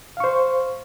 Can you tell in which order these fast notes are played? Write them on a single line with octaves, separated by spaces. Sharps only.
F5 C#6 C5